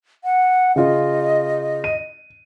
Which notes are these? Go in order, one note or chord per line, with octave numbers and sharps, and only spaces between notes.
F#5
C#3 F4 D#5
D#7